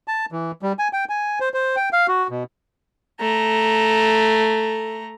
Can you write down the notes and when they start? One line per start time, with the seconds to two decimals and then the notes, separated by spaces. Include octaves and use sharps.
0.08 A5
0.32 E3
0.62 G3
0.79 G#5
0.93 G5
1.09 G#5
1.40 C5
1.54 C5
1.76 G5
1.93 F5
2.08 F#4
2.30 B2
3.20 A3 A#5